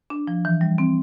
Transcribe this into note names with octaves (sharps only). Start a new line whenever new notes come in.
D4
F3
E3
G3
C4